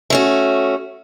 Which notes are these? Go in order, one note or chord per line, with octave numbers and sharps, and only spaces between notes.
A3 C#4 F#4